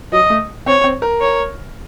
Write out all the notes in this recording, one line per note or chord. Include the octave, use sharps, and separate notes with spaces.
F#3 D#5
A3
C4 C#5
C4
A#4
C#5